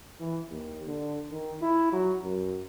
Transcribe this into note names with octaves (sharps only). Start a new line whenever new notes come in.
E3
D#2
D3
D#3
E4
F#3
F#2